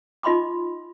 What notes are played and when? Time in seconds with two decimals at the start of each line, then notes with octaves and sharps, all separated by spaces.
0.23 D#4 F4 D#5 B5 C6 D6